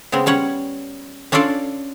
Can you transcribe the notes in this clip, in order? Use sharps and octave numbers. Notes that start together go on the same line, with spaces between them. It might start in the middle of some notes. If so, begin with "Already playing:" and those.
C#3 G#3 B3 C4
G3 C#4 C#5 F#5
C#4 D4 F4 A4 D5 F5